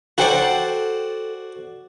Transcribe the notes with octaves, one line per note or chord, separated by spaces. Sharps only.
F#4 A4 C5 D5 F#5 G5